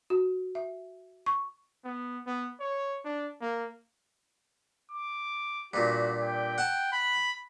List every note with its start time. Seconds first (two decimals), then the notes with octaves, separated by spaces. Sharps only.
0.10 F#4
0.55 E5
1.26 C#6
1.84 B3
2.27 B3
2.60 C#5
3.05 D4
3.41 A#3
4.91 D6
5.74 G2 A#2 F#4
6.21 G5
6.58 F#5 A5
6.92 B5